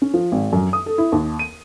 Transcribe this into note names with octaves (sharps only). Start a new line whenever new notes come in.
C#4
F3
G#1
F#2
D#6
A4
E4
D#2
D#7